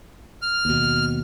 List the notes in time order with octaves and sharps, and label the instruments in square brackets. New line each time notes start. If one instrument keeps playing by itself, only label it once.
[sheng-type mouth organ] F6
[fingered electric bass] D#2 B2